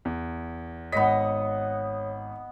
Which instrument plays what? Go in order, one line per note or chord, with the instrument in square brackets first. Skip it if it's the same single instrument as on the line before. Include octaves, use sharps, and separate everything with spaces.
[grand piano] E2
[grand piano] G#1 B6 [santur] B3 D#5 [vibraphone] C#5